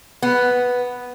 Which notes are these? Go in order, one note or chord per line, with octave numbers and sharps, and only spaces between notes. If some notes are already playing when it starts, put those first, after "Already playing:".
B3